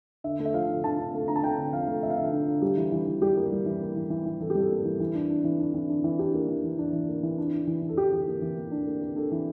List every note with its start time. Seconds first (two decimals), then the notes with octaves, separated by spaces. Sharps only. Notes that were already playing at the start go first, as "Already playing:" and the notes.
0.24 D3 E5
0.39 A3
0.45 E5
0.54 F3 F5
0.69 D3
0.84 D3 A5
0.98 D3
1.13 A3
1.28 D3 A#5
1.36 A5
1.43 D3 G5
1.58 D3
1.73 F3 F5
1.88 A3
2.03 F3 E5
2.10 F5
2.17 D3 E5
2.32 D3
2.48 D3
2.62 G3 G4
2.77 E3
2.92 E3
3.07 E3
3.22 G3 G4
3.36 A#3
3.52 G3
3.66 E3
3.81 A#3
3.96 E3
4.10 E3
4.26 E3
4.40 E3 A4
4.50 G4
4.55 G3
4.61 A4
4.71 A#3
4.85 E3
5.00 E3
5.15 D4
5.30 D4
5.44 E3
5.59 D4
5.74 E3
5.89 D4
6.04 E3
6.19 D4 G4
6.34 A#3
6.49 E3
6.64 E3
6.78 D4
6.93 E3
7.08 A#3
7.23 E3
7.38 D4
7.53 D4
7.67 E3
7.83 E3
7.89 A4
7.97 E3 G4
8.12 E3
8.27 A#3
8.42 E3
8.57 A#3
8.71 D4
8.87 A#3
9.02 A#3
9.16 D4 A4
9.32 E3